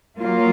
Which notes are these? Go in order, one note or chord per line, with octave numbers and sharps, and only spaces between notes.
F#3 A#3 F4